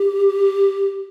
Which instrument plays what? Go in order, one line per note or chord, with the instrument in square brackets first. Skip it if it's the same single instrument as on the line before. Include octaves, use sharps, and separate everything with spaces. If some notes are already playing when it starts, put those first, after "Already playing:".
Already playing: [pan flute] G4